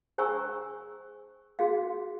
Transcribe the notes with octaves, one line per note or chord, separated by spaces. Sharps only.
G#4 C5 G#5 A#5 C#6 E6
F#4 G#4 F5